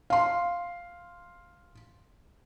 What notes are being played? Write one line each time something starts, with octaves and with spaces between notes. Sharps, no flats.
F5 C6